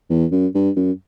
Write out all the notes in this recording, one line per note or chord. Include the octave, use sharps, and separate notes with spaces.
E2
F#2
G2
F#2